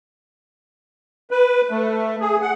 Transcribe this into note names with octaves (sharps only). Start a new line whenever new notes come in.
B4
A3
G#4
F#5